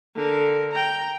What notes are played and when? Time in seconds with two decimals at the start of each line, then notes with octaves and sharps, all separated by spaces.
0.15 D3 A#4
0.72 G5 A#5